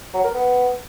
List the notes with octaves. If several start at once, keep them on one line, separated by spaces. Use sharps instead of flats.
F#3
A#4
B3